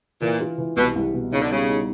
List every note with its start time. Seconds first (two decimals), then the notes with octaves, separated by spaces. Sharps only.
0.22 A#2 E3
0.41 F4
0.58 E3
0.77 C2 B2
0.96 C2
1.13 B2
1.32 C#3 D#4
1.42 D3
1.51 C#3 G3
1.69 D#4